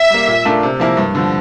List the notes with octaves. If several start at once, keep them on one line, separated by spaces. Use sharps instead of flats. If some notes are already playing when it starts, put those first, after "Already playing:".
Already playing: E5
G3 A#3
A#2
A3 D4 F4 A#4
C3
F3 A#3 E4 A#4
G2
D3 F3